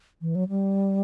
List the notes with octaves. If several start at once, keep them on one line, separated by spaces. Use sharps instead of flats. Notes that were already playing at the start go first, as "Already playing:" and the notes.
E3
F#3
G3